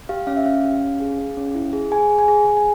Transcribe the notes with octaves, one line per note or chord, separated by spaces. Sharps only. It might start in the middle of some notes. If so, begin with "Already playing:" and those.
G4 F5
C#4 F5
E5
C#4 F5
G4
C#4
G#4
G#4
C#4
E4
G#4
G#4 G#5
G#4
G#5
G#4
G#4
G#5